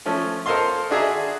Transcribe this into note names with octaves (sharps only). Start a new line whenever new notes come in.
F3 A3 C#4
A4 A#4 C5 D#5 F5 C6
D4 F#4 G#4 D#5 E5 A#5